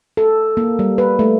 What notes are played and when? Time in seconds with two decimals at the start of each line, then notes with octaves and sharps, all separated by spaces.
0.17 A4
0.57 A#3
0.79 G3
0.98 B4
1.19 A3